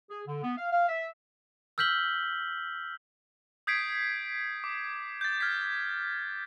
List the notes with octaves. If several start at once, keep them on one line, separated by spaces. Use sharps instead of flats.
G#4
D3
B3
F5
F5
E5
E6 F6 G6 B6 F#7 G7
D#6 G6 G#6 B6 C7 D7
D6
G6 A6
F6 G#6 B6